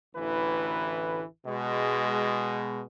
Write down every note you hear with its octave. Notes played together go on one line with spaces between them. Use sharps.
A1 D2 E3 B4
B2 G#3